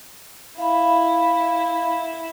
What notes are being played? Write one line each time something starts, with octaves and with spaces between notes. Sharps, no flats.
E4 F5 B5